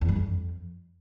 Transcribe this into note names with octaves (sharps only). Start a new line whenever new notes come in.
E2
G2
F2